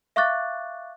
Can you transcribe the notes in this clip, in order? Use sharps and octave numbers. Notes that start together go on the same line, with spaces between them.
E5 F5 C#6 D6 F#6 A6